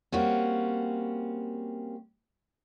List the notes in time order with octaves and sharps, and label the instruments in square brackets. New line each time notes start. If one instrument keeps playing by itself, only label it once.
[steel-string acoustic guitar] G3 A#3 C4 C#4 F#4